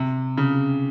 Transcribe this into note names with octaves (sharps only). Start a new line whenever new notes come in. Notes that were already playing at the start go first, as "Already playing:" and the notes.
Already playing: C3
C#3